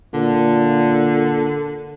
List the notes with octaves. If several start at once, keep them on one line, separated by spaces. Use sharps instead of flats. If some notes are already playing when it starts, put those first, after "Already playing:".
A#2 D3